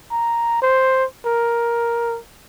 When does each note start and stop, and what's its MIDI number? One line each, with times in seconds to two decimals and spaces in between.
0.12 0.59 82
0.62 1.05 72
1.26 2.18 70